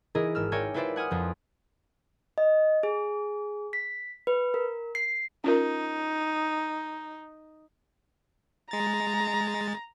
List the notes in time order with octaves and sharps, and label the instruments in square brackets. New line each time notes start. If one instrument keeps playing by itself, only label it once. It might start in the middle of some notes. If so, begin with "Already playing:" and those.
[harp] E3 E4 G#4 A#4 D#5
G#1 E6 F6
A#4 C#5 D5 E5 G5 G#5
E4 F4 B4 C5 D5 E5
F#5 G#5 D#6 F6
F2 F3
[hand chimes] D#5
G#4
B6
B4
A#4
C7
[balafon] C#4 F4 A#4 [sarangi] D#4
[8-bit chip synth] G#3 A6 [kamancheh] A#5